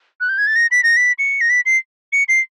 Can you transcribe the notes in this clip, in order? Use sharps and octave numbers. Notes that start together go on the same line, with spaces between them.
F#6
G6
G#6
A6
A#6
B6
A#6
B6
C#7
A#6
B6
C7
C#7
C7